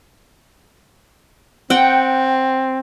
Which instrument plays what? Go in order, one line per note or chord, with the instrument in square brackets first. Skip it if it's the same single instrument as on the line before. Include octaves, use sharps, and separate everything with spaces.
[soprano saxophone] C4 [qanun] F#5 G5